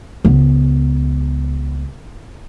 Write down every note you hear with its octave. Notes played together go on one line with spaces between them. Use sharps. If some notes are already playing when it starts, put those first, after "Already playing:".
C#2 B3